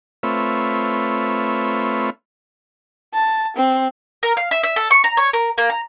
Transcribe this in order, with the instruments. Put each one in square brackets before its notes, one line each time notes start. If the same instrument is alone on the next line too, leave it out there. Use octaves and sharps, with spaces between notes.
[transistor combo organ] A3 C4 F4 B4 C#5 E5
[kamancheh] A5
C4
[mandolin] A#4
F5
E5
E5
A4
C#6
A#5
C#5
A#4
A#3
A#5